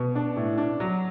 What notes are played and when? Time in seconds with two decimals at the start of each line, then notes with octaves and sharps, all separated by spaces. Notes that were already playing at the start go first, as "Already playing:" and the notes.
Already playing: B2
0.15 D4
0.36 A2
0.58 D4
0.80 F#3